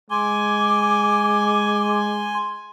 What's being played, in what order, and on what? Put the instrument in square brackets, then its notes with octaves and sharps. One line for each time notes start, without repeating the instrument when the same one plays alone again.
[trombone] G#3 [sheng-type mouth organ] G#5 [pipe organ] C6 [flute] D6